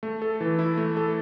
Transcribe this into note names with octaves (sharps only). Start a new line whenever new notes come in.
A3
A4
E3
E4
A3
A4